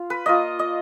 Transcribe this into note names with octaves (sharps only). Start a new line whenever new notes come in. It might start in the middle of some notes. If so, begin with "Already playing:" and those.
Already playing: F4
B4
A#3 F4 D#5
D#5